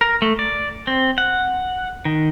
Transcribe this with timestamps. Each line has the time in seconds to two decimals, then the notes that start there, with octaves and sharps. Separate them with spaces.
0.01 A#4
0.22 A3
0.39 D5
0.87 C4
1.18 F#5
2.05 D#3